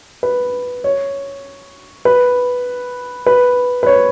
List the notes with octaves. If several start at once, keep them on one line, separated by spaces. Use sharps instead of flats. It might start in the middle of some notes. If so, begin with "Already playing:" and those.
B4
C#5
B4
B4
B4
C#5